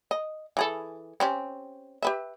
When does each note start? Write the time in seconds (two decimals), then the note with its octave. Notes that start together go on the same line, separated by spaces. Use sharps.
0.11 D#5
0.57 E3 G#4 A4
1.20 C4 C#4 G4
2.03 G4 B4 E5